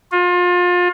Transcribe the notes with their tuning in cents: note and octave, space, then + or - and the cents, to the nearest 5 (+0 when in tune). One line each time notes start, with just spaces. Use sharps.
F4 +30